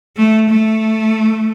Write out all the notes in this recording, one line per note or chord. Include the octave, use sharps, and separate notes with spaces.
A3
A3